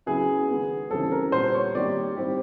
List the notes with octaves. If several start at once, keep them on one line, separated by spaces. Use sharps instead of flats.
C#3 F#3 B3 E4 G#4
D#3 G#3 B3
C#3 E3 G3 C4 A4
A#4
A#2 G3 B3 C5
C#5
D#3 G3 A#3 D#4 G4 D5
G3 C4 E4 G4